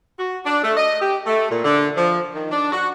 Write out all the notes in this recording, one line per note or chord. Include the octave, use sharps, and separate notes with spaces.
F#4
D4
A3
D#5
G4
A3
A#2
D3
F3
D#3
D4
F#4